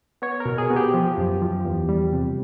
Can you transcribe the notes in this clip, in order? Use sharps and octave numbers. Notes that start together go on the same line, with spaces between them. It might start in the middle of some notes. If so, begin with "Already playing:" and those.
B3 C#5
A#4
B2
G#4
B3
G4
F3
F#2
F3
E2
G3
C3